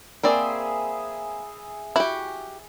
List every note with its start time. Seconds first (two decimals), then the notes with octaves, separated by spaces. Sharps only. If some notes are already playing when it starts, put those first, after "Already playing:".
0.23 A#3 C4 G#4 D5 E5 B5
1.96 E4 F#4 G4